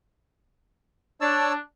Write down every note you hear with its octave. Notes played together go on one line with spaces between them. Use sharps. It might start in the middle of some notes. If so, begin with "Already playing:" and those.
D4 C#5 A5 E6